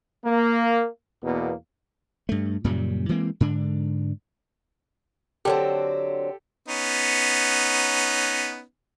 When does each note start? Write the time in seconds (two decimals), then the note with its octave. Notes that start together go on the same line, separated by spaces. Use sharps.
0.24 A#3
1.23 E2 B2 A#3
2.29 G2 A3
2.64 F#2 A#2 C#3 G3
3.09 E3 G#3 A#3 C4
3.40 G#2 D3 D4
5.45 D3 F#3 C4 G4 A4
6.68 B3 C#4 D#4